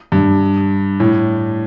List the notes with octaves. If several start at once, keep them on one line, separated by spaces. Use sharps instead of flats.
G2
A2